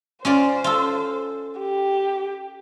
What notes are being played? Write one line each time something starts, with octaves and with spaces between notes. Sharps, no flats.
C#4 F4 C5 D5
F4 A4
G4